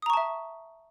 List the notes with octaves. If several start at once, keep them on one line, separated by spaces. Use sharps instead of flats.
E5 A5 A#5 C#6 D#6